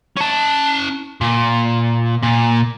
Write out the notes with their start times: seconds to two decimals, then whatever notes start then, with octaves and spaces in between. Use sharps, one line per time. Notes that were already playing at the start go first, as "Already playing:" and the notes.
0.17 C#4 A5
1.21 A#2
2.23 A#2